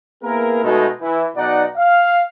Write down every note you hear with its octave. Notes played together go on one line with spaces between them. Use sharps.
A#3 B3 E4 G#4 A#4
B2 G#3 A3 D#4
E3 E4
B1 D#4 D5 F#5
F5